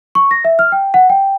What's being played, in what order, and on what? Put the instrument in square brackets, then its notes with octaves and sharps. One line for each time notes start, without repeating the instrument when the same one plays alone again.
[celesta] C#6
A#6
E5
F6
G5
F#5
G5